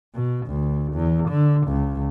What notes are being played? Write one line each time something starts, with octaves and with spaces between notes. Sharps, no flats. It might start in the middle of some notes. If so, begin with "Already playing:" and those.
B2
D2
E2
D3
C#2